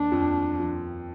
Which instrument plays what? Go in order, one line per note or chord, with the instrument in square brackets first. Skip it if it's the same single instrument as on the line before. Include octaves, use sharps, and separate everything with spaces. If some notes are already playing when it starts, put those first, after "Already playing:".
Already playing: [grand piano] D#2 D#3 [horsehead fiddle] D4
[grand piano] F2 F3
F3